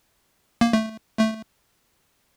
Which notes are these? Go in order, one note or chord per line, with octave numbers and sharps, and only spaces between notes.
A#3
A3
A3